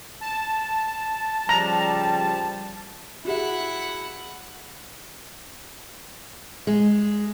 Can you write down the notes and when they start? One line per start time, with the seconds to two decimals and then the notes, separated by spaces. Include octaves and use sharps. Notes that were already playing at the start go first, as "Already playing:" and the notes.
0.21 A5
1.49 C#3 F3 G3 A#5
3.25 E4 F#4 G#4 E5 F#5
6.67 G#3